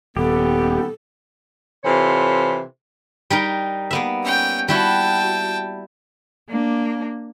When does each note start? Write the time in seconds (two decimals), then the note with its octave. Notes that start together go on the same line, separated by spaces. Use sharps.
0.17 D#1 B3 G4 A4
1.84 C3 E3 F4 A4 C5 C#5
3.30 G3 D#4 A#4
3.91 A#3 B3 E5
4.24 C#4 G5
4.68 G3 E4 F#4 G5 A5
6.48 A#3 D4